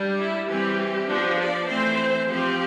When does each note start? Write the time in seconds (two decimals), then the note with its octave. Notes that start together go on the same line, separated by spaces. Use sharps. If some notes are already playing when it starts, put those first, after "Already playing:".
Already playing: G3 D4
0.19 E4
0.48 E3 G3 C4 G4
1.08 F3 B3 D4
1.39 D5
1.68 E3 A3 C4 C5
2.29 F3 C4 G4